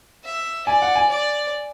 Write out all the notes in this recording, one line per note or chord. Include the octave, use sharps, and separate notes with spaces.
E5
D5 G#5
F#5
G#5
D5